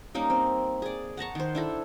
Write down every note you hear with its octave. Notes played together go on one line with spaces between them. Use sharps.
G3 A#3 C#4 D#4
C4
G#4 D5
F#5 A5 A#5 C#6
D#3 C5
D4 E4 A4